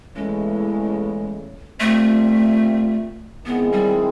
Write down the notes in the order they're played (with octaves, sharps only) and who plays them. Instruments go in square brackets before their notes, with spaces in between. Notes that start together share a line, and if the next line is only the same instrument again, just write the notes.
[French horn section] E2 C#3 E3 A3 C#4 [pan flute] G#3
[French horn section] A#2 G3 C4 F4 [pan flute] A3
[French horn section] D#3 G#3 C4 E4 G#4 [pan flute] B3
[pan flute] G3